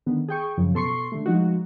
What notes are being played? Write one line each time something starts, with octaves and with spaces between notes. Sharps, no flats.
D3 D#3 B3
G#4 G5 C#6
F#2 C#3 F3
B2 A4 C6 C#6 C7
D3 A3
F3 G#3 D#4 F#4